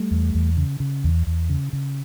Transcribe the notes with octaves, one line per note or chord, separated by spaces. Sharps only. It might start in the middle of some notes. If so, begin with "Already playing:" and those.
Already playing: G3 A3
E2
E2
C#3
C#3
E2
E2
C#3
C#3